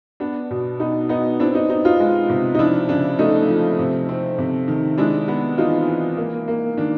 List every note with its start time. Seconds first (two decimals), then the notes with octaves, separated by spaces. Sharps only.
0.20 B3 D4
0.50 B2
0.80 B3 D#4
1.09 B3 D#4
1.40 C4 D4 E4
1.55 D#4
1.70 C4 D#4
1.85 D#4 F4
2.00 G#3
2.29 C3
2.55 D#4
2.59 F3 D4 E4
2.89 C#3 D4
3.19 A3 D#4
3.49 F3
3.79 C3
4.09 C4
4.38 C3
4.68 D#3
4.98 G#3 D4 E4
5.28 B3
5.58 E3 D#4 F4
5.88 E3
6.17 A#3
6.48 A#3
6.77 D#3 D4